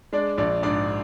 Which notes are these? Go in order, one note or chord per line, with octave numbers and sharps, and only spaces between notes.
G#3 D4 D5
A#1 D4 D5
G#2 D4 D5